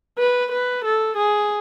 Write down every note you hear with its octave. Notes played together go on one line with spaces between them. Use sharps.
B4
B4
A4
G#4